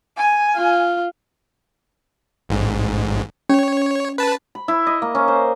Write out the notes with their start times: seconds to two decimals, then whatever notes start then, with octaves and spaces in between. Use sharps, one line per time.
0.17 G#5
0.55 F4
2.49 A1 G#2
3.49 C#4 C#5
4.18 B4 A5
4.55 B5
4.68 E4
4.87 D#5
5.02 A#3
5.15 C#4
5.28 C5